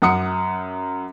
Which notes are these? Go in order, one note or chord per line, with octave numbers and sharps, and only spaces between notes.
F#2 F#5 D#6 C#7